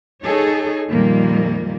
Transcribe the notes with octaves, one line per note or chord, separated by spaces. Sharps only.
D#4 G#4 A4 C#5
F2 A#2 D#3 G3 A#3